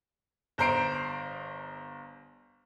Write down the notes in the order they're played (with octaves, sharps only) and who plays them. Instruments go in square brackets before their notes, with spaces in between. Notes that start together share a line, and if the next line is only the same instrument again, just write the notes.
[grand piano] G1 C5 A#5 C7 D7